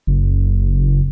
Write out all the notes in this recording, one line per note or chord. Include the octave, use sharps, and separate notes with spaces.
F#1